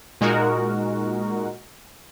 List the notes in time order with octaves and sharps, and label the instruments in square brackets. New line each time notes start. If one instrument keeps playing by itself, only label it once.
[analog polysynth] A#2 G#3 D#4 F#4 A#4